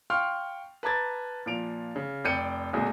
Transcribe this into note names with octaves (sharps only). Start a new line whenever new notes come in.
F5 G5 C6 C#6 F6
B4 A5 A#5 D6 G#6 A6
A#2 F3 D7 F7
C#3
F1 D5 G5 G6 C#7 D#7
D1 C#2 A#2 G#4